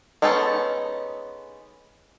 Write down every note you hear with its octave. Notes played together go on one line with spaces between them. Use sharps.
G#3 B3 C#4 D#4 A4